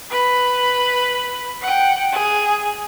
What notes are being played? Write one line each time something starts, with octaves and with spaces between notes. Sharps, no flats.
B4 B5
F#5 G5
G#4